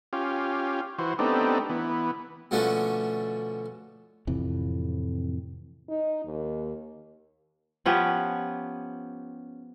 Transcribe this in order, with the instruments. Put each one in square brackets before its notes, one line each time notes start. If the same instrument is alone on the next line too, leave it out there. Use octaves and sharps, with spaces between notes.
[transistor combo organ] C#4 F4 G4
E3 F#4 C5
A3 B3 C4 D4 D#4 G4
E3 B3
[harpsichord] B2 D3 F3 A3 C#4 D4
[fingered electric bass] F2 A2 C3 E3
[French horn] D#4
D#2
[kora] F3 B3 C#4 G4